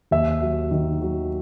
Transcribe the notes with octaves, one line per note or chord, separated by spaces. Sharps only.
D#2 E5
F#3
D#3
F#3